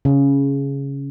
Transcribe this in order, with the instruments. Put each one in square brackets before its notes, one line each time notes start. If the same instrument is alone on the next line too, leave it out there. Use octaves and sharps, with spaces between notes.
[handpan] C#3